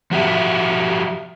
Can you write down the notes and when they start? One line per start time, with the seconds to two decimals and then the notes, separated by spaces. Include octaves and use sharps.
0.11 F3 F#4 G4 E5